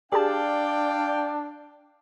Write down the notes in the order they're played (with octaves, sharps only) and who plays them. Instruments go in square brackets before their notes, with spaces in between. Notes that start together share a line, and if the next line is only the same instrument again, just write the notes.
[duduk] D4 [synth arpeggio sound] G4 G#4 A5 [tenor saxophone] D5 [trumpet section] F5 G5